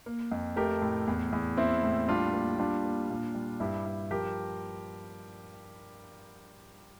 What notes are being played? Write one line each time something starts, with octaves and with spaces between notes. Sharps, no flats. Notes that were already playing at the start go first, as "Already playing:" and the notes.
A#3
F2
A3 G4 A#4
A2
E2
E2
A#3 C4 E4
A2
G3 D4 F4
A#3
G3 D4 F4
A#3
A#2
G3
G2 E4 G4
G2
F3 G4 A#4